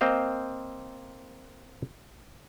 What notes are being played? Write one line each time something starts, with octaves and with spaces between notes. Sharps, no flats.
A#3 C4 C5 D#5 F5